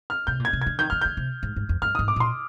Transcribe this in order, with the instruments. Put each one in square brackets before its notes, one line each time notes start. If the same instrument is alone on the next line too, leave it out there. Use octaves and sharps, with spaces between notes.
[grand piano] F6
[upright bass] C3 [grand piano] G6
[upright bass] A#2
[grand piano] G#6
[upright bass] C3
[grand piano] G#6
[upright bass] D3
[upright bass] D#3 [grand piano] G6
[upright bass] D3 [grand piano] F6
[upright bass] D3 [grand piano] G6
[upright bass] C3
G#2
G#2
F2
[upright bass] G2 [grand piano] F6
[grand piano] D#6
[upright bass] G#2
[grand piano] D6
[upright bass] A#2 [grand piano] C6